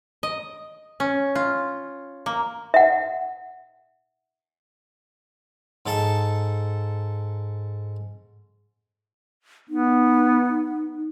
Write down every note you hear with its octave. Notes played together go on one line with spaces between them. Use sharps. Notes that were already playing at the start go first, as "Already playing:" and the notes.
D#5
C#4
F4
A#3
E5 F#5
G#2 A4 A5
B3 D#4